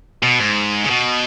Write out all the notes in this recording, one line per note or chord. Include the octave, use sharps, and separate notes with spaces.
B2
G#2
C#3
B2